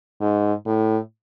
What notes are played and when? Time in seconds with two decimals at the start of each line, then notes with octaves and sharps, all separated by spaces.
0.21 G#2
0.66 A2